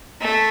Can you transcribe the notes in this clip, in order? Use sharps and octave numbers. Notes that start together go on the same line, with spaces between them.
A3